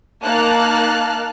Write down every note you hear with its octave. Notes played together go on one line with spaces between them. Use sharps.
A#3 D#4 A5 F6 F#6